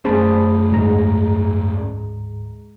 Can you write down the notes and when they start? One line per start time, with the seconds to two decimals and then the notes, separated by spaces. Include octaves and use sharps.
0.05 F#2 A3 C#4 G#4 C5 A5 B5
0.72 D2 G#2 G#3 A#5